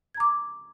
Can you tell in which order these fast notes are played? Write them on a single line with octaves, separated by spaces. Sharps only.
G#6 A#5 D6